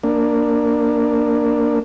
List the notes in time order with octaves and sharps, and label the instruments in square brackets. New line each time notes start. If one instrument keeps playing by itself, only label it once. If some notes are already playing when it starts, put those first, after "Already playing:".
[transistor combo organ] A#3 D4